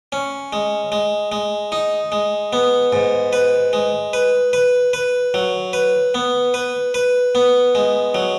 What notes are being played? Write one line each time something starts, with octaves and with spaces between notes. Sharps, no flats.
C#4
G#3
G#3
G#3
D#4
G#3
B3
G#2
B4
G#3
B4
B4
B4
F#3
B4
B3
B4
B4
B3
G#3
F#3